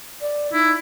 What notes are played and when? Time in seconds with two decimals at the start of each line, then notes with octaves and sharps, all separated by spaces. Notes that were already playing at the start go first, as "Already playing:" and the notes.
0.22 D5
0.53 D#4 E4